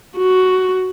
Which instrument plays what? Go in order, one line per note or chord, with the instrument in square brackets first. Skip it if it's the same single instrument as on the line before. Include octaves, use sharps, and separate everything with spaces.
[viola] F#4